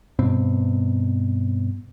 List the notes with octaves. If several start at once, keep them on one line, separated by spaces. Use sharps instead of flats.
G2 B2 C4